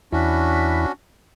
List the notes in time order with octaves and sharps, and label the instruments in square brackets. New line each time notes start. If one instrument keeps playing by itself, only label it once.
[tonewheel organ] E2 E4 B5 [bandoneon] C#4 D4 F#4